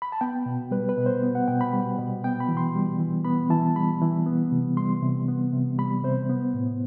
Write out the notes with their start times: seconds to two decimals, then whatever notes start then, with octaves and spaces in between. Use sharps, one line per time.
0.02 B5
0.12 A5
0.21 B3 G5
0.46 B2
0.71 G3 B4
0.89 B4
0.98 B2
1.06 C5
1.23 B3
1.35 F#5
1.48 B2 G5
1.61 B5
1.73 G3
1.98 B2
2.24 B3 G5
2.40 B5
2.49 E3
2.57 C6
2.75 G3
2.99 E3
3.25 B3 B5
3.50 E3 A5
3.75 G3 B5
4.02 E3
4.26 B3
4.52 C3
4.77 G3 C6
5.02 C3
5.28 B3
5.53 C3
5.78 G3 B5
6.04 C3 C5
6.30 B3
6.54 A2